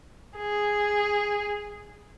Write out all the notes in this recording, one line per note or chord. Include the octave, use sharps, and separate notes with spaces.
G#4